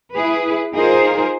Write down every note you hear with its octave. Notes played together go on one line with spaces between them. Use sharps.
E4 G#4 B4
D#4 F4 G#4 A#4 C5